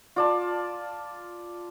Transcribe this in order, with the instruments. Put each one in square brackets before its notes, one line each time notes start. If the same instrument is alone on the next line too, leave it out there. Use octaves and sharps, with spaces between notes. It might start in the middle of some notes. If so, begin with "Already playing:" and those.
[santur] F4 D5 A5